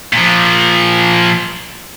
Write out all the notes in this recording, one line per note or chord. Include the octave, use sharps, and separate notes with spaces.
A#2 F3